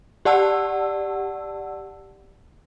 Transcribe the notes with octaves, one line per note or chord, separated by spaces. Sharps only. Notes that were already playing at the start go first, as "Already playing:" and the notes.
G4 D5 F#5 A5 E6